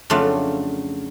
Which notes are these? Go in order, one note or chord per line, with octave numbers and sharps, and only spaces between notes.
F2 C#3 F#3 A3 D4 F4